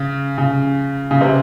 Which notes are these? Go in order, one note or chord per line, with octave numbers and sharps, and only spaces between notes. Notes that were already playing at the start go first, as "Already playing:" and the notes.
Already playing: C#3
C#3
C#3
C3